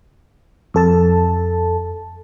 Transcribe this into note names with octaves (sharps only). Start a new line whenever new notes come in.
F2 A4 A5